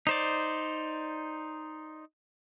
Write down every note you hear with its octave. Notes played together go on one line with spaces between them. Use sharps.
D#4 C5 D5